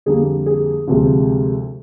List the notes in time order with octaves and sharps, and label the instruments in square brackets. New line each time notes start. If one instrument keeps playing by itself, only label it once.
[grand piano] F2 D3 G3 A#3 G#4
G#4
D2 C3 F3 G#3